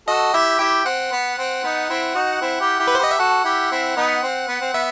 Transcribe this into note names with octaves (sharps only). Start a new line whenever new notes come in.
F#4 A4 D#5
E4 G4 E5
E4 G4 G5
C4 F#5
B3
C4
B3 D#4
C4 E4
D#4 F#4
C4 E4
E4 G4
E4 G4
B4
C5
G4 B4 D#5
E5
F#4 A4 F#5
E4 G4
C4 E4
B3 D#4
C4
B3
C4
B3 E5